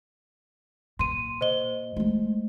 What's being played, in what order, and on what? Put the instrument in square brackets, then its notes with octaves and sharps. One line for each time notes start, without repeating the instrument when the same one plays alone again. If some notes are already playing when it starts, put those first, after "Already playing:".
[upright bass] A#2 [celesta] C6 D#7
[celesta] C5 D#5 G7
[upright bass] G#3 A3